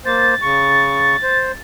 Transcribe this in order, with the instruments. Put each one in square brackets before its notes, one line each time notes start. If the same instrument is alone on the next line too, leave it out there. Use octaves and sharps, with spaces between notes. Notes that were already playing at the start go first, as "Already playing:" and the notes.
[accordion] A#3 C5 [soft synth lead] A6
[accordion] C#3 C#6
C5